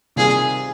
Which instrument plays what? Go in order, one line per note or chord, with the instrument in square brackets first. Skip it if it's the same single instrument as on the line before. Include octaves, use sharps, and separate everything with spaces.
[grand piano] C3 D#3 G3 C4 F4 [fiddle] G#4